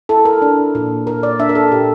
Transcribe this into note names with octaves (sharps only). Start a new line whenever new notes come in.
E4 A4
A#4
D4
A#2
A#2 A#4
D5
D4 E5
A#4
A4
A#2 G4